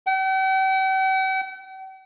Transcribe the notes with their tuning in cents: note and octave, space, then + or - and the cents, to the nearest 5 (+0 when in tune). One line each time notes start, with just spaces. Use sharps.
G5 -45